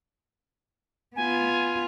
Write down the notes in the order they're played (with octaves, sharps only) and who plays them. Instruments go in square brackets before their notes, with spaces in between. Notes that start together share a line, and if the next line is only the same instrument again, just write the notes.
[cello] B3 F4 [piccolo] G#5